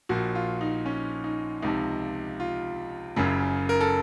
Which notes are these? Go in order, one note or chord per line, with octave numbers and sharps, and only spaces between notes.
A#1 A#2 F3 F#4
F4
D#4
C#4
D#4
C#2 C3 F3 D#4
F4
F#1 F#2 C#3
A#4
A4